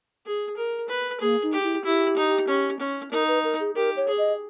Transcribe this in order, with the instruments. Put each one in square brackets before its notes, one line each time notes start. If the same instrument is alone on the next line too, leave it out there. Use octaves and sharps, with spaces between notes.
[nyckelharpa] G#4
A#4
B4
[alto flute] A#3 [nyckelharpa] G#4
[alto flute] D#4
[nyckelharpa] G4
[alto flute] E4
[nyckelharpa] E4 [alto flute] G4
[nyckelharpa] D#4
C#4
C#4
[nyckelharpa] D#4 [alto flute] A#4
[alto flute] B4
A#4
G#4
[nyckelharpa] G4 [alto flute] A#4
[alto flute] C#5
[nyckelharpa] G#4
[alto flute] D#5